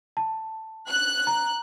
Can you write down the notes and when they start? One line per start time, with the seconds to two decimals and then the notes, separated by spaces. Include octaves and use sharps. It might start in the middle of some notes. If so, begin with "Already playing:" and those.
0.17 A5
0.88 F#6
1.27 A#5